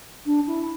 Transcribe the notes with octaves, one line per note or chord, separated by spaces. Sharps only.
D4
E4